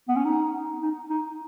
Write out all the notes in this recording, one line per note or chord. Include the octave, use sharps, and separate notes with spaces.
B3
C#4
D#4
D#4
D#4